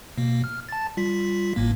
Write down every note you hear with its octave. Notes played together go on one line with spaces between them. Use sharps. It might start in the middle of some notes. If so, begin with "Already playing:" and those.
B2 A#3
F6
A5 A6
G3 F4 B6
G#1 A2 A#3